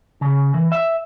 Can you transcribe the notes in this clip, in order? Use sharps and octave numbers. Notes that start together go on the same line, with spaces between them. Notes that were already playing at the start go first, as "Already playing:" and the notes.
C#3
E3
E5